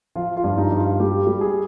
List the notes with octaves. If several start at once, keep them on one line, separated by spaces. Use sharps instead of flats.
F3 F4
F4
G2
D#4
G2
F4
G3 G4
G3
G#4